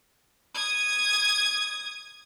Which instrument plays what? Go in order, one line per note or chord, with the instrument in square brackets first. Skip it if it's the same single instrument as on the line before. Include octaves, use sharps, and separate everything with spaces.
[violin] D#6 G#6